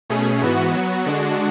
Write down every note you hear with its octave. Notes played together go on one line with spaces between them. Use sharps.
B2 A3 C#4 G#4
G#2 E3 B3 F#4
F#3 B3 F#4
D3 G#3 D4 F#4